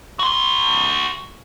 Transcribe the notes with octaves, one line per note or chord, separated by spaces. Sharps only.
F#4 C6